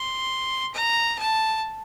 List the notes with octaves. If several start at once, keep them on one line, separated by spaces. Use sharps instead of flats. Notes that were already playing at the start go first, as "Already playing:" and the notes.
Already playing: C6
A#5
A5